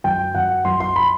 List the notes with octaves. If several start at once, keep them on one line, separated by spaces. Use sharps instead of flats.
F#2 G5
F#2 F#5
F#2 C6
C6
B5